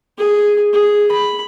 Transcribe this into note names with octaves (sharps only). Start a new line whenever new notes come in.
G#4
G#4
B5